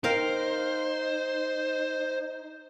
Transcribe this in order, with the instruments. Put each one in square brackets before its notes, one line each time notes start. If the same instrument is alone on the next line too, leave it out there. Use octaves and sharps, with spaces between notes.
[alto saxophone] D#4 [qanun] A#4 F5 G5 [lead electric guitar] C5